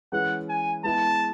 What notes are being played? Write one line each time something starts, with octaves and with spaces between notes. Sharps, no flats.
E3 G#3 C#4 G#4 B4 F#5
G#5
G#3 B3 E4 G#4 A5